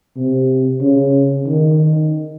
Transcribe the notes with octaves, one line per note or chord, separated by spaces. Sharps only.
C3
C#3
D#3